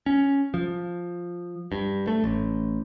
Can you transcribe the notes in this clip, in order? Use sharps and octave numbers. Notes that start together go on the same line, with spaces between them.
C#4
F3
G2
A3
A1